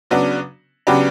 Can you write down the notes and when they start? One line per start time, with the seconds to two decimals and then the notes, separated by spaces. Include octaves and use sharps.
0.11 C#3 F#3 B3 D4
0.87 C#3 F#3 B3 D4 G4 B4